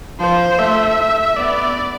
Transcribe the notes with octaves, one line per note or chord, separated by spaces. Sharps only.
F3 C5
A3 E5
B3 D5